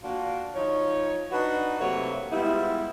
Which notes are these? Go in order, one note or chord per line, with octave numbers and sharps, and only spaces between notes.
A#3 D4 F4 F#4
F3 D#4 C#5
D4 D#4 F#4 B4
C3 F#3 A3 A#3 C#5
G3 G#3 B3 E4 F4